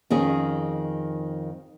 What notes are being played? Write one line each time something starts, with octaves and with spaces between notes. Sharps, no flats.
F2 D#3 C#4 G#4